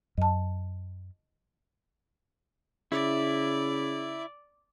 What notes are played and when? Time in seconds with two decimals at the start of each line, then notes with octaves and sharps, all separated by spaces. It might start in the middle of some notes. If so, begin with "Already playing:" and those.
0.18 F#2 D#5 A5
2.92 C#3 E4 D5